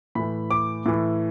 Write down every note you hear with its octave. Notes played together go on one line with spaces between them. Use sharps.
A2 E3 B5
D6
A2 E3